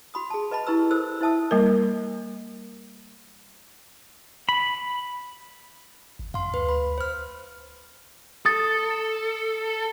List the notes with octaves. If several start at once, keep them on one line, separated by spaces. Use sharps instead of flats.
F#4 B5 D#6
G#4 A5
B4 D#5 A5 B5
E4 G4 B4 A#5 E6
A4 A#4 C5 E6
E4 C5 E5 A5 D#6 E6
G3 A#3 A#4
B5
G#1
F#2 F5 C6
D2 B4
B5
C5 F6
A4 D#6 A6